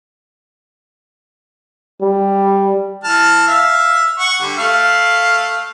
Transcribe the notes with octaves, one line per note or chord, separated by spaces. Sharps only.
G3
E3 A5 F6
E5 F5
F#5 C#6
D3 G3
A3 F5